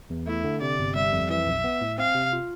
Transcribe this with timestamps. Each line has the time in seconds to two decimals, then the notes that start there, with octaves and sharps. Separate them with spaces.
0.10 E2
0.27 A3 E4
0.44 D3
0.61 C3 D5
0.79 G1
0.95 G3 E5
1.12 F2
1.30 E3 E5
1.47 B1
1.64 B3
1.81 A2
1.98 C4 F5
2.15 C3
2.33 F4